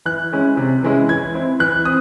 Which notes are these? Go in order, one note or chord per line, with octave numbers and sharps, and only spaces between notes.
E3 F#6
G#3 C#4 E4
C3
E3 G#3 C#4 E4
E3 G#6
C4 E4
E3 F#6
C4 D#6